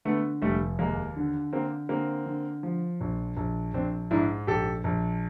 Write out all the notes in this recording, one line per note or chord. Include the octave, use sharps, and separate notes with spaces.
D3 A3 B3
F1 G3 A3
D#2 G#3 A#3
D3
D3 A#3 C4
D3 A#3 C4
D3
F3
A#1
A#1
A#1 C4 D4
G#2 D4 E4
A#1 G4 A4
A#1